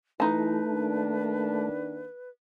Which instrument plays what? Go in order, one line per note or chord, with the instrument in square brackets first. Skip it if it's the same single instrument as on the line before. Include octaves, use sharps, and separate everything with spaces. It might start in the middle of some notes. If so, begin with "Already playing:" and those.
[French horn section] E3 E4 [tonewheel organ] A3 [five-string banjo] D#4 A5 [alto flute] B4
[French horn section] D#3 A#3 D4